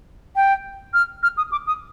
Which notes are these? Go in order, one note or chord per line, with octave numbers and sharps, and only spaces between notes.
G5
F6
F6
D#6
D6
D#6